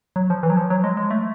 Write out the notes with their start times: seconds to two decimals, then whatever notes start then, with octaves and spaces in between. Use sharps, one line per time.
0.16 F#3
0.30 F3
0.43 E3
0.50 F#3
0.57 F3
0.70 F#3
0.84 G#3
0.97 G#3
1.11 A3